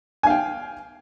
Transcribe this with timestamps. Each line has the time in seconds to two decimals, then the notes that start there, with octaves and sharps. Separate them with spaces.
0.23 G#5
0.27 F5
0.30 G5